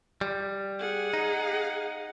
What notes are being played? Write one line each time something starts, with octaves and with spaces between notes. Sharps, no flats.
G3
G#4 F#5
D#4